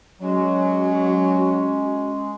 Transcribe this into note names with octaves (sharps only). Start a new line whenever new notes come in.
F#3 G#3 C#4 F#4